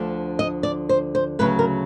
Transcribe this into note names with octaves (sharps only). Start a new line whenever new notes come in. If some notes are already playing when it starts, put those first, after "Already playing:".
Already playing: D2 D3 F3
D#5
D5
C5
C5
D2 C#3 F#3 B4
A#4